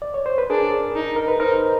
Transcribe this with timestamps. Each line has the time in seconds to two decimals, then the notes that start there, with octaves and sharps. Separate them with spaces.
0.02 D5
0.14 C#5
0.26 C5
0.38 B4
0.50 D4 G#4 A#4
0.96 D#4
1.16 A#4
1.28 B4
1.40 D#4 A#4 C5